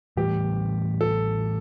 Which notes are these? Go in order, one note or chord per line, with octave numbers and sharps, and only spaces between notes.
A2 E3 G3 G4
A4